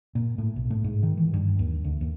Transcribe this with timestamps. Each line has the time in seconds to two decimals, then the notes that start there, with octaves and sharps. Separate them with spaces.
0.15 A#2
0.38 A2
0.56 B1
0.70 A2
0.84 G#2
1.03 D#3
1.17 E3
1.34 G2
1.59 D#2
1.84 D2
2.01 D#2